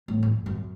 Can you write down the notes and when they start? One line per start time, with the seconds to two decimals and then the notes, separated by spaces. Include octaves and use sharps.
0.08 A2
0.23 F2
0.46 F#2